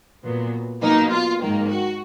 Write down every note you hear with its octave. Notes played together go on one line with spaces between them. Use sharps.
A#2 F#3 B3
B2 F#3 A#3 D#4
F4
G#2 D#3 F#3 A#3
F#4